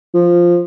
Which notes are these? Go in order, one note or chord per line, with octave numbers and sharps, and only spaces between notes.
F3